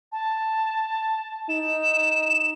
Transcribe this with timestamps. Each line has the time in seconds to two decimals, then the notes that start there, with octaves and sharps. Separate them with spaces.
0.12 A5
1.49 D#4 E7